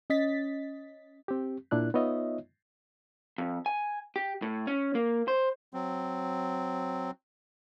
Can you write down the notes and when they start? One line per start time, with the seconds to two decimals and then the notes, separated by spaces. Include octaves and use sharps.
0.10 C#4 D#5 A6 B6
1.28 C4 G4
1.71 A#2 D4 E4 F#6
1.94 B3 D#4 F4 C#5 D#5 E5
3.38 F2
3.66 G#5
4.16 G4
4.42 A2
4.67 C#4
4.95 A#3
5.28 C5
5.74 F#3 C4